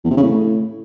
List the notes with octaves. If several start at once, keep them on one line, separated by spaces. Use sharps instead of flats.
E2
C3
C#3
A2